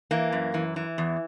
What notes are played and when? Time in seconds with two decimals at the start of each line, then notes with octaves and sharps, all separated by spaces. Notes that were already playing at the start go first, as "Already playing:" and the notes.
0.11 E3 A#3
0.32 F#2
0.54 E3
0.76 E3
0.98 E2